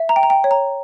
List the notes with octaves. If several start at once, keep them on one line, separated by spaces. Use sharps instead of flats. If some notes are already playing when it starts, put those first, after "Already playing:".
Already playing: E5
A#5
G5
A#5
G5
C#5
A#5